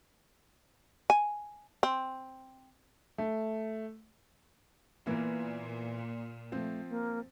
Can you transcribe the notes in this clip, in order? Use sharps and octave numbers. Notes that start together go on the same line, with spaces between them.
G#5
C4
A3
A#2 E3 A#3 B3
F3 A3 C4
A#3